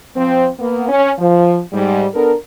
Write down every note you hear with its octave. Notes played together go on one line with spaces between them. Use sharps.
F3 C4
A#3 B3
C#4
F3
G#2 G3
B3 D4 A4 A#4